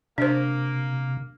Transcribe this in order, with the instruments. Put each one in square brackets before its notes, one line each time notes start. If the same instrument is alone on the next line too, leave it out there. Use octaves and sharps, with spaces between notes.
[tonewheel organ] C3 [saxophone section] A#3 [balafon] D4 C5